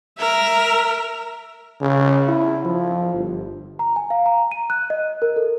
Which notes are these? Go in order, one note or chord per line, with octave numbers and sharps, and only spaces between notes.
A#4 E5
C#3
E4
F3
G1
A#5
G#5
F5
A#5
D#7
F#6
D#5
A#4
A4